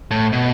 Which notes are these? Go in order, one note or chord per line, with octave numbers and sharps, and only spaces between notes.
A2
B2